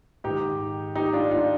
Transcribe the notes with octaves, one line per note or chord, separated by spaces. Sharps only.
G#2 D#3 D#4 G4
D#4 G4
D4 F4
D4 F4